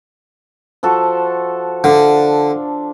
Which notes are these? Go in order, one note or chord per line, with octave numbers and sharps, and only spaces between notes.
F3 F#4 A4
D3 D4 F5